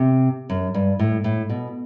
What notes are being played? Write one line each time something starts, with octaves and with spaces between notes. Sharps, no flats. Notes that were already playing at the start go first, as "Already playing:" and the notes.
Already playing: C3
F#2
G2
A2
A2
B2